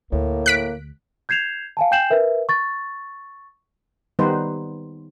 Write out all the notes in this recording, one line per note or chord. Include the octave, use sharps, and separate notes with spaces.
D2 A2 A#3
F#6 B6 D7
G6 G#6 C7 E7 F7
F5 G#5 A5
G5 G#5 G6 C7 E7 F#7
A#4 B4 E5
C#6 A6
D#3 G3 B3 D#4 B4 C5